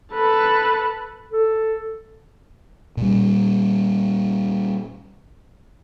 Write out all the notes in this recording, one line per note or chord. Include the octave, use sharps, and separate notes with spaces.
A4 B4
A4
A#2 G3